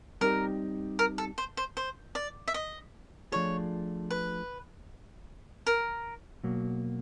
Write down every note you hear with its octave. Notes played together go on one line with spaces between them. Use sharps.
G3 C4 D#4 G4 A#4
A#4
A4
C5
C5
C5
D5
E5
D#5
F3 A3 D4 F4 G#4 C#5
B4
A#4
B2 F#3 A#3